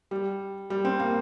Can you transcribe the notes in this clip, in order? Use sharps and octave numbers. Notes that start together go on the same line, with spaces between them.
G3
G3
C4
A#3